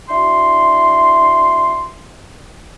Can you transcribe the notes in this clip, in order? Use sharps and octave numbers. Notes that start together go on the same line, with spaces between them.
D4 E4 F#4 C6